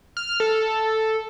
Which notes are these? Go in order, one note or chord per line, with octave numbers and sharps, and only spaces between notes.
F6
A4